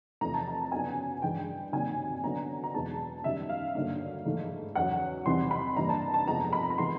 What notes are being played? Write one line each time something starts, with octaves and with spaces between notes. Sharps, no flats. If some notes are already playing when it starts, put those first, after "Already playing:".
E2 C3 F3 A3 A#5
A5
A#5
F#2 C#3 F#3 B3 D4 G#5
G2 E3 G#3 G5
C3 D#3 F#3 A#3 D4 G#5
D3 F#3 B3 D4 A#5
A#5
E2 B2 G#3 A5
F#2 D#3 G3 E5
F5
G2 D3 F#3 A#3
G#2 E3 A3
E2 C#3 F#3 F#5
E2 C3 E3 G3 C4 C6
B5
G2 E3 G3 A#3 A#5
A5
A5
F2 C3 F3 G#3 B3 A#5
B5
A#5
B5
E3 G#3 B3 C6